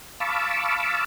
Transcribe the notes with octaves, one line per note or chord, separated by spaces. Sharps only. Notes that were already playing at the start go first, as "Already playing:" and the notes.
F5 A5 B5 C#6 D6 E6